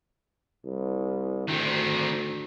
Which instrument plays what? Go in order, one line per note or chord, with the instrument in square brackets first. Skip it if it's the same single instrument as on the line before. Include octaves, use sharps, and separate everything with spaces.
[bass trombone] C2
[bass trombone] D2 [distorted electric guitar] D#3 C4